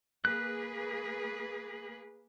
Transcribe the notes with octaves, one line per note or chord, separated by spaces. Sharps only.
A#3 G#4 B4 F#6